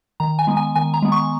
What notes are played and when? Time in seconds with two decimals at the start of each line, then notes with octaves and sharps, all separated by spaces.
0.20 D#3 A#5
0.39 G#5
0.47 G#3 B3
0.57 G#5
0.75 D#3 G#5
0.94 A#5
1.02 G#3 B3
1.12 C#6